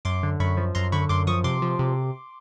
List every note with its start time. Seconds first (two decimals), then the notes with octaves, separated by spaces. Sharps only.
0.05 F#2 C6 D6
0.23 D3
0.40 F#2 B5 C#6
0.57 F3
0.75 F#2 A#5 C6
0.92 D3 B5 C#6
1.09 F#2 C6 D6
1.27 F3 C#6 D#6
1.44 C3 C6 D6
1.62 F3
1.79 C3